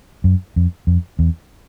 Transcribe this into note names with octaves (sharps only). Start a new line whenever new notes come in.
F#2
F2
F2
E2